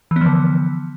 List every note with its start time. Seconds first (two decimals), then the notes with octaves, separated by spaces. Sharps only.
0.11 E3
0.16 B3
0.21 F3
0.26 D3